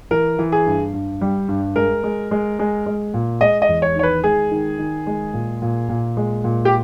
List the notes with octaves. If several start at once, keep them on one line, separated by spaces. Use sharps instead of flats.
E3 A#4
E3
G#4
G2
G2
G3
G2
G#3 A#4
G#3
G#3
G#3
G#3
A#2
G#3 D#5
D#5
E2
C#5
D#3 C#5
B4
G#3 G#4
D#3
D#3
G#3
A#2
A#2
A#2
G#3
A#2
G4